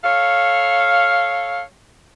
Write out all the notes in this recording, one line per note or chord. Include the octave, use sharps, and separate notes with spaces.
A4 C#5 F5